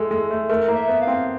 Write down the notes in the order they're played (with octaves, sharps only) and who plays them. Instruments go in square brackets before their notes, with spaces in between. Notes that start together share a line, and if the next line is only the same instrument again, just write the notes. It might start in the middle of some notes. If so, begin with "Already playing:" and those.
Already playing: [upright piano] G#3 A3 [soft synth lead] A4
[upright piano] G#3
A3
[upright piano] A3 [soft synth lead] A#4
[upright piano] A#3
[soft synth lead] E5
[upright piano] B3
[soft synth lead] F5
[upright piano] C4